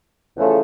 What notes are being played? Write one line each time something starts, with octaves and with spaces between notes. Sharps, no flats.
E2 C#3 F3 A3 C#4